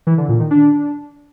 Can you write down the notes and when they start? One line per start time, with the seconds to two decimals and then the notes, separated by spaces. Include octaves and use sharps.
0.07 E3
0.18 D3
0.29 A#2
0.40 D#3
0.51 D4